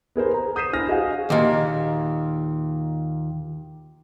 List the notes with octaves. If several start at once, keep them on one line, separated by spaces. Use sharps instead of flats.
B3 G#4 A#4 C5
A#5
D#6 G6 B6 C7 D#7 E7
D4 E4 C5 G#5 F6 A#6
F#4 G#4 D#5 F5 F#5 G#5
D#2 A#2